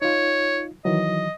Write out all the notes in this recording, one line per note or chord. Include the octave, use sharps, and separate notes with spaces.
D#4 F4 C#5
D#3 E3 F#3 D#5